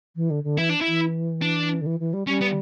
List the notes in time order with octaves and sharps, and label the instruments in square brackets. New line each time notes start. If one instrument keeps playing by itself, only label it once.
[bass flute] E3
D3
D3
[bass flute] E3 [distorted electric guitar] E4
[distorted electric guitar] D4
E4
[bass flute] E3
[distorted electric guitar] D4
[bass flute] D3
E3
E3
G3
[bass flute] G3 [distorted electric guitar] C#4
[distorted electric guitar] B3